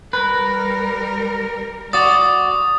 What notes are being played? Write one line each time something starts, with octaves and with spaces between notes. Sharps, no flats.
G3 A#4 B4
F#4 D5 D#6